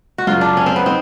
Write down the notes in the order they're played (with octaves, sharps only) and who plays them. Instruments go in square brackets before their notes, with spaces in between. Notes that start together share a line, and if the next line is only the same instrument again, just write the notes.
[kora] F#4
[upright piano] F#2 C#3 F#3 [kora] F4
[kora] D4
C#4
C4
B3
[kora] C4 [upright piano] D#4